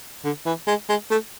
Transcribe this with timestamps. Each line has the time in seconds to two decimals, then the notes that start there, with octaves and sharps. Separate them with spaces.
0.25 D3
0.46 E3
0.67 G#3
0.89 G#3
1.11 A3